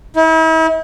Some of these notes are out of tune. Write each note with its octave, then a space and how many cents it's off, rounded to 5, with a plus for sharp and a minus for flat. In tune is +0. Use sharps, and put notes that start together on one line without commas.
E4 -40